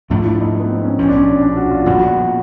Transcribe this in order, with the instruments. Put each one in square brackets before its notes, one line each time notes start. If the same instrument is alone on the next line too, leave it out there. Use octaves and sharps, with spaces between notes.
[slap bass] G#2 F3 A3 D4 [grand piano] F4
[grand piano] E4
D#4
B3
C4
C#4
[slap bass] B1 A#2 F3 [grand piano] C#4
[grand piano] D4
C#4
D4
F#4
F4
[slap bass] A#1 A#2 G3 B3 [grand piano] F#4